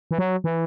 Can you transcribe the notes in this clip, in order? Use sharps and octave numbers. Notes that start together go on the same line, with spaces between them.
E3
F#3
E3